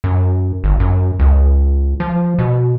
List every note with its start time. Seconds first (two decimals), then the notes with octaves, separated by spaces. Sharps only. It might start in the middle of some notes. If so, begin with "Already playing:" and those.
0.04 F#2
0.64 G1
0.80 F#2
1.19 C#2
2.00 F3
2.39 B2